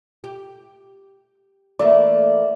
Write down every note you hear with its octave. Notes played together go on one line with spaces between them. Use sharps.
G4
E3 A3 A#3 D5